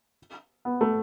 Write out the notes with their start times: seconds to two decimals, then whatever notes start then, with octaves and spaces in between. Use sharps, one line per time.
0.65 B3
0.81 A3